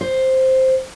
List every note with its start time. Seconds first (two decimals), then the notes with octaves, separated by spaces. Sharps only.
0.01 C5